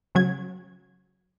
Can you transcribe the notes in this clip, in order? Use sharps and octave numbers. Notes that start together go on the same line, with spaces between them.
C#3 F#3 G#6